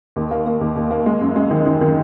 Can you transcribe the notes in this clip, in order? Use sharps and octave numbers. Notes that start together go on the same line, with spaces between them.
D#2
A#3
A#3
D#2
D#2
A#3
G#3
F#2
G#3
D#3
D#3
D#3